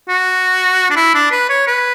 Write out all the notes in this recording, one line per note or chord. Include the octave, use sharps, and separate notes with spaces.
F#4
D4
E4
D4
B4
C#5
B4